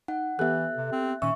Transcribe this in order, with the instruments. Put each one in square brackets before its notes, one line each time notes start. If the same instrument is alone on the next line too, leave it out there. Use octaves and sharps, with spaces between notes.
[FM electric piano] D#4 [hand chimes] F#5
[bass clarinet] E3 [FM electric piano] B3 G4 A4 [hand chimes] E5 F#6
[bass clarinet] C3
C4
[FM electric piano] A#2 D#3 E6 [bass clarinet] C#4 [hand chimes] E5 C#6